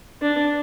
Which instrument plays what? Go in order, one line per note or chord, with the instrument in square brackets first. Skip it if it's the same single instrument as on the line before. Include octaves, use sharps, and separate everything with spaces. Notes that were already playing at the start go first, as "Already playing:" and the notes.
[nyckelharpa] D4